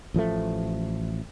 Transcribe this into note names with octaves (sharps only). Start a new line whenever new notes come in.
A1 F3 G#3 A3